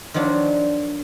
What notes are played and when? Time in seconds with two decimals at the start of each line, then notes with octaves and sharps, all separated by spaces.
0.14 D#3 F3 F#3 D4